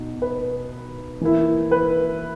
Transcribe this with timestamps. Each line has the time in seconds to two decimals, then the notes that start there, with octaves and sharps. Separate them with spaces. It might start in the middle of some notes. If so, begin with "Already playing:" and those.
Already playing: B2 D#4
0.22 B4
1.21 E3 A#3 E4
1.71 B4